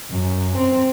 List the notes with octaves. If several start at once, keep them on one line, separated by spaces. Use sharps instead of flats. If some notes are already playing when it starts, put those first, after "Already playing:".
F#2
C4